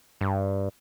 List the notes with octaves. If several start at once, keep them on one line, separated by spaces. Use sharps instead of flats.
G2